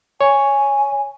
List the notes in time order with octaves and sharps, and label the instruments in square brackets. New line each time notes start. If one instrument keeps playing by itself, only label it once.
[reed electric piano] C#5 [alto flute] G#5